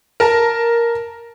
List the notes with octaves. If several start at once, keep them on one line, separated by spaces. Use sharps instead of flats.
A#4 A5